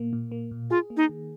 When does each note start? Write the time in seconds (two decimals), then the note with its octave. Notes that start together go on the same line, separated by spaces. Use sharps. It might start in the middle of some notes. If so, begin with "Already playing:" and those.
Already playing: A#2 A#3
0.13 A#2
0.32 A#3
0.51 A#2
0.70 F4 G#4
0.90 A#3
0.97 D#4
1.09 D#3